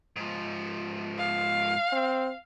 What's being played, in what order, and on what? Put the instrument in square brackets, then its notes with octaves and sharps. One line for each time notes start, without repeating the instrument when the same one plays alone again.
[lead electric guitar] G#2 F3
[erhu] F5
[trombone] C4